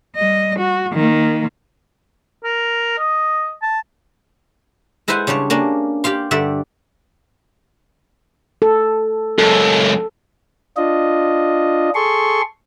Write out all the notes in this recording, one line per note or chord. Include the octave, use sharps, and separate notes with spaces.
G3 D#5
F#4
D#3 A#3
A#4
D#5
A5
G#3 E4 B4 C5 F#5 G#5
C#3 G3 D4 C#5
A#3 C#4 D4
G4 D5 F5 C6
G2 D3 G3 D5 E5
A4
C#2 F#2 A4
D4 F4 D#5
G#4 A4 C6 C#6